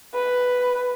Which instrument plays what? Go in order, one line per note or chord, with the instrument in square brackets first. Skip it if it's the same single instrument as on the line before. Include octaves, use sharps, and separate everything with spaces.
[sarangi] B4